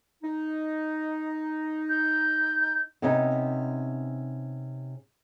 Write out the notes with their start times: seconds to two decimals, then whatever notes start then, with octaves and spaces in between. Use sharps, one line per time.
0.23 D#4
1.89 G6
3.02 C3 B3 C#4 D#4